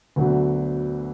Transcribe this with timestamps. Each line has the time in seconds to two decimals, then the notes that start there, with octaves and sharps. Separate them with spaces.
0.16 D2 D3 F#3 B3